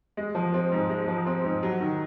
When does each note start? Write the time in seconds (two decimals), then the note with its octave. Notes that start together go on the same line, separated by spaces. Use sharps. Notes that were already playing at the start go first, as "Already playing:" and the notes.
0.17 G#3
0.35 F3
0.54 C4
0.72 G#2
0.90 G#3
1.08 F3
1.26 C4
1.44 G#2
1.63 F#3
1.80 D#3